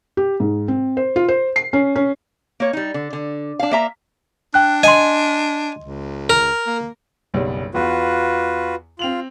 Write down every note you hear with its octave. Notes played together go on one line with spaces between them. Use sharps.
G4
G#2
C4
C5
F4
C5
C7
C#4
C#4
A#3 C#5
G3 D#4
D3
D3
D4 F5
A#3 E5 A#5
D4 G5 F#6
D#5 G#5 C6
C#2
A#4
A#3
F#1 B1 G3
E2 F4 F#4 B4
C4 F4 F7 F#7